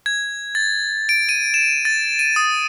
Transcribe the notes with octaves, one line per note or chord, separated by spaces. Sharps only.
G#6
A6
D7
D#7
E7
A6
D#7
D#6